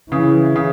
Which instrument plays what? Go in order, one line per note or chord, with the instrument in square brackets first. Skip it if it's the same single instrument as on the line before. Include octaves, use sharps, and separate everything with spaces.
[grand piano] C#3 [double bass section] E3
[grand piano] C#3